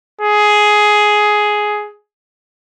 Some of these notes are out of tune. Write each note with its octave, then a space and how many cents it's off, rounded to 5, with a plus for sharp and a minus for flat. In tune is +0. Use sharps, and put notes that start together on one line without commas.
G#4 +10